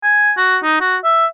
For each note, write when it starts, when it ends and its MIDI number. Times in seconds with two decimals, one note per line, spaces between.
0.04 0.32 80
0.37 0.57 66
0.64 0.77 63
0.81 0.97 66
1.04 1.26 76